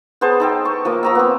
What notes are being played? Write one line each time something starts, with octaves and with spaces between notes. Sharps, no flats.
B3 G#4 C5 A5
D#4 A4 G5
C#6
F3 A#3
F3 A#5 E6
B3 C4